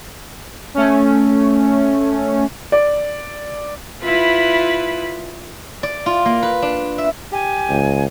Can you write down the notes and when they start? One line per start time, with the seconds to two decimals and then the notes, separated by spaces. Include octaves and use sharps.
0.74 A3 C#4
2.72 D5
4.03 E4 F4 B4
5.83 D5
6.06 F4
6.26 A#3
6.43 B4
6.62 D4
6.98 E5
7.32 G4 G#5
7.69 C#2